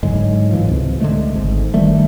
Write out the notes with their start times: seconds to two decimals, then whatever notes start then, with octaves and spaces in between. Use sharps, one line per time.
0.03 G#2 D3 F#3 G#3
0.51 A2 E3 F3
0.67 C#2 C3
1.00 D3 E3 G#3 A3
1.34 G#1 G#2
1.74 G1 D#3 G3 A3